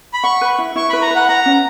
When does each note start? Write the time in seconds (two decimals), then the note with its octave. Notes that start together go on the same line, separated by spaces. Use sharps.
0.14 B5
0.24 F#5 C#6
0.41 B4
0.58 E4
0.76 E4 C#6
0.90 B4 B5
1.02 A#5
1.11 B4 F#5
1.29 F#5 A#5
1.46 C#4